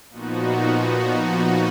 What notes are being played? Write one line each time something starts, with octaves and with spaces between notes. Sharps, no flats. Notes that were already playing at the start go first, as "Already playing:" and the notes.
A#2 F3 B3 D#4 F#4